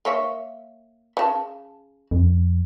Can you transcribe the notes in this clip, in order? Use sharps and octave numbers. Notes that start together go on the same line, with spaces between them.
A#3 C#5 E5
C#3 A5
F2